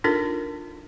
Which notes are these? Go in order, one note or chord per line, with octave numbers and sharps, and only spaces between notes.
D4 D#4 F4 A4 A#4